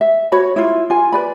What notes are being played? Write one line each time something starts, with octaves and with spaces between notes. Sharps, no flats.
E5
F#4 C#5 B5
E4 F4
F4 G#5
B4 D5 B5